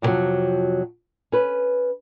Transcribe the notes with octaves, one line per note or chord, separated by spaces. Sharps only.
F2 A2 C3 D#3 F3 F#3
C#4 B4